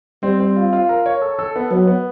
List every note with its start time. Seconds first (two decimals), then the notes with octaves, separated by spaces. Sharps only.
0.23 G3 C4
0.40 C4
0.56 F4
0.73 F4
0.89 A#4
1.06 C#5
1.22 A4
1.39 A4
1.56 B3
1.71 F#3 B3
1.87 B3